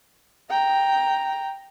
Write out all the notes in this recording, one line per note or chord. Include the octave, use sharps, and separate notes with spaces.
G5 A#5